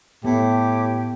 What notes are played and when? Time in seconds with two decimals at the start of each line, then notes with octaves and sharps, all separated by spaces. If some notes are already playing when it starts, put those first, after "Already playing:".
0.24 A2 B3 G4